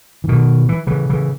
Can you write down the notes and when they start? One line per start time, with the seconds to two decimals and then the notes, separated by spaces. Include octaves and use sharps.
0.24 E3
0.29 B2 D#3
0.69 E3
0.87 C#3 E3
1.09 C#3 E3